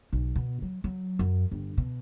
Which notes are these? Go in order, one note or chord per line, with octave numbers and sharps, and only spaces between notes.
B1
B2
F#3
F#3
F#2
G1
B2